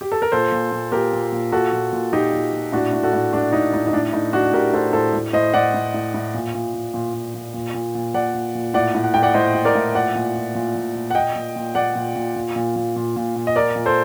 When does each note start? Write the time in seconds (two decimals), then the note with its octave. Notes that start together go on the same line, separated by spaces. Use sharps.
0.01 G4
0.12 A4
0.22 A#4
0.32 A#2 A4 C5
0.52 A#2
0.72 A#2
0.92 A#2 G4 A#4
1.13 A#2
1.32 A#2
1.52 A#2 F#4 A4
1.72 A#2
1.93 A#2
2.13 A#2 D#4 G4
2.33 A#2
2.53 A#2
2.72 A2 D4 F#4
2.93 A2
3.03 F#4 A4
3.13 A2
3.33 A2 D4 F#4
3.53 A2 D#4
3.73 A2 D#4
3.87 D#4
3.93 A2 D4
4.13 A2 D#4
4.33 A2 D4 F#4
4.53 A2 G4 A#4
4.73 A2 A4 C5
4.93 A2 A4 C5
5.14 A2
5.33 A2 C5 D#5
5.54 A2 D5 F#5
5.74 A2
5.94 A2
6.14 A2
6.34 A#2
6.55 A#2
6.74 A#2
6.94 A#2
7.14 A#2
7.34 A#2
7.54 A#2
7.74 A#2
7.95 A#2
8.14 A#2 D5 F#5
8.34 A#2
8.55 A#2
8.74 A2 D5 F#5
8.95 A2
9.04 F#5
9.14 A2 G5
9.22 D5 F#5
9.34 A2 C5 D#5
9.55 A2
9.65 A#4 D5
9.75 A2
9.94 A#2 D5 F#5
10.15 A#2
10.35 A#2
10.55 A#2
10.75 A#2
10.95 A#2
11.11 F#5
11.15 A#2 D#5 G5
11.36 A#2
11.56 A#2
11.75 A#2 D5 F#5
11.95 A#2
12.16 A#2
12.36 A#2
12.56 A#2
12.76 A#2
12.96 A#2
13.16 A#2
13.36 A#2
13.47 D#5
13.56 A#2 A#4 D5
13.76 A#2
13.86 A4 C5